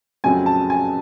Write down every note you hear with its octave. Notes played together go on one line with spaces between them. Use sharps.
F2 C#3 F#3 A3 C4 G#5
A5
G#5